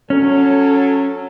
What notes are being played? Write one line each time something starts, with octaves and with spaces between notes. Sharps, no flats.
F#3 C#4 A4